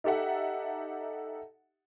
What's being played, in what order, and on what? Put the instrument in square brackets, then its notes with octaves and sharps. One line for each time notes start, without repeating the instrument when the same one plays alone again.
[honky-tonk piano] D#4 G4 A4 E5 F#5